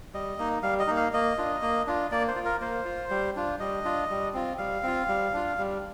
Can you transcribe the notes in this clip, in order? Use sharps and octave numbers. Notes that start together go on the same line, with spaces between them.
G3 D#5
A#3 D#4
G3 F5
D#5
A#3 D#4
F5
A#3 D#5
D4 F4
A#3
D4 F4
A#3 D5
C5
F4
A#4
A#3 C5
F4
G3
D4 F4
G3 D#5
D4 F4
G3
C4 F4
G3 F5
C4 F4
G3
D4 F4
G3